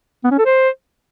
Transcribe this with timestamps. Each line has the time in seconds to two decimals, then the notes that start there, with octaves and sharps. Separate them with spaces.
0.24 B3
0.31 C#4
0.39 A4
0.46 C5